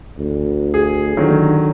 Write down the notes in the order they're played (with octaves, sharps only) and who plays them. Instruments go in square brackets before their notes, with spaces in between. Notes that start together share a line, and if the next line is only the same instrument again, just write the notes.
[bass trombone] D2
[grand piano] G#4
[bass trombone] D3 [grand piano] D#3 F#3